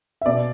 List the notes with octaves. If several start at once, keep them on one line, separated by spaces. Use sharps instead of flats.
E5
B2 D5